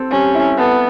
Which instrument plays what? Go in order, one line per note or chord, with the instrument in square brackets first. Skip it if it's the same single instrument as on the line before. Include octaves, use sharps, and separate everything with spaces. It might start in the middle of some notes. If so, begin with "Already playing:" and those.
Already playing: [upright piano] C4 A4
[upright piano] G3 [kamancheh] C#4
[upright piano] E4
[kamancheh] B3 [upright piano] A4